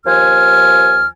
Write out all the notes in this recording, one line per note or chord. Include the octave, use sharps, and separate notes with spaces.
D#2 F3 G#5 F6